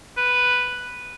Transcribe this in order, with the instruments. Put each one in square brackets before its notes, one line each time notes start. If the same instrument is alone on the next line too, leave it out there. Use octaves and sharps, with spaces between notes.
[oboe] B4